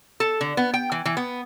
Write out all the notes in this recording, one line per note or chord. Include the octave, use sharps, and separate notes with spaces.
A4
D3
B3
G5
E3
E3
B3